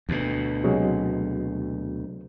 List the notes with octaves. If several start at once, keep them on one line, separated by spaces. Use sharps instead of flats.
D2 B2
C3 F#3 G#3